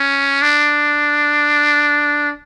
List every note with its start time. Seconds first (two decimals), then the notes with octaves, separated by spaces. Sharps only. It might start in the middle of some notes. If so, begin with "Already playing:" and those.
Already playing: C#4
0.42 D4